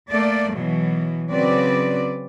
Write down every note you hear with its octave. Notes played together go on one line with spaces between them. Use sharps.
A3 A#3 D5
B2 E3 F#3
C#3 F#3 C4 B4 D5